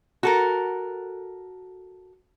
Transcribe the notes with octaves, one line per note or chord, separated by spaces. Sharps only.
F#4 A4 A#4